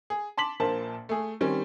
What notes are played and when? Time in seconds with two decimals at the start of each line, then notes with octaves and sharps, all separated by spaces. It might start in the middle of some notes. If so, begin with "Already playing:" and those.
0.10 G#4
0.37 A5 C6 D6 B6 F#7
0.60 A#1 A#2 A#3 C5 A5
1.09 A3 G#4
1.41 D#3 G3 C4 C#4